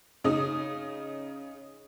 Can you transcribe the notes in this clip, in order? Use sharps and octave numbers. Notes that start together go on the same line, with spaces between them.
C#3 D#4 D#6